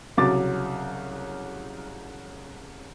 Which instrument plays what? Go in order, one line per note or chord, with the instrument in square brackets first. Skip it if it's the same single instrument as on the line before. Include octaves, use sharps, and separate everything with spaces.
[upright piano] C2 C#3 F#3 D6 A6